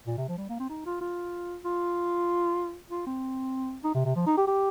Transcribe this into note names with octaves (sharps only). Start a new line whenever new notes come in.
A#2
C3
F3
G3
A#3
C4
D#4
F4
F4
F4
F4
C4
D#4
C3
C3
F3
D#4
G4
G4